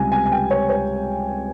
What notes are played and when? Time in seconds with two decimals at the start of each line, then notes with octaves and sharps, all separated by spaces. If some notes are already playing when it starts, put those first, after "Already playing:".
Already playing: C#2 C3 G3 G#5
0.12 G#5
0.26 G#5
0.32 G5
0.51 C#5
0.70 C#5